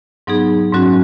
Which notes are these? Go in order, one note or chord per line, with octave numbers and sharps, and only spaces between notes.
G#2 F#3 B3 D#4 G#4
G#2 F#3 C#4 F#4